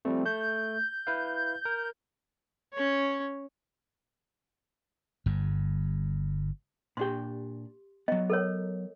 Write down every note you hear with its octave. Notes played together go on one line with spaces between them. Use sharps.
F3 G3 A3 C4
A3 G6
E4 B4 F5
A#4
C#4 C#5
G1 G2
A#2 D4 G4 G5 C6
F#3 B3 D#5
A4 A#4 C#5